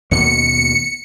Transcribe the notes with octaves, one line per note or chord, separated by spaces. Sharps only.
D#2 B2 A#3 C#7